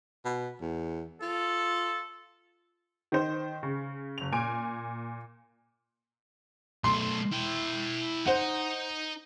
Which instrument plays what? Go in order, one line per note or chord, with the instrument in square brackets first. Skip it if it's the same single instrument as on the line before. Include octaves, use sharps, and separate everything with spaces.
[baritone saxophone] B2
E2
[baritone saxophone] F4 [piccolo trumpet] A4
[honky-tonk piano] D#3 C5
C#3
F#1 F7
A#2 G#5 D7
[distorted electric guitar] B1 A3 [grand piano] C6
[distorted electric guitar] E4 G5
[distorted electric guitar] D#4 [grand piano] C5 F#5